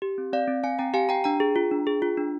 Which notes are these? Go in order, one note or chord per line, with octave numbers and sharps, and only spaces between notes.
G4
C4
C4 D5 F5
C4
C4 F5 G#5
C4 G5 A#5
G4 F5 G#5
G4 G5 A#5
D4 G5 A#5
G#4
F4
D4
G#4
F4
D4